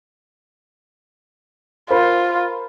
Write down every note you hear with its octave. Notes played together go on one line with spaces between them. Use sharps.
F4 A#4 C5 B5